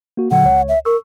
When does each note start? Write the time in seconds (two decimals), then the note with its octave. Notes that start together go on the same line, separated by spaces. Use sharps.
0.17 A#3 F#4
0.31 A#2 D3 F#3 F#5
0.44 C#2 C#5
0.69 E5
0.85 A#4 C#6 E6